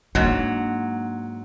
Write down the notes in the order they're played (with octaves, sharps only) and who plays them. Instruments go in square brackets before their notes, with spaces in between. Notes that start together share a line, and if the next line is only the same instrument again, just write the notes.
[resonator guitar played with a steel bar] G#2 F#3 [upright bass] A#3 D4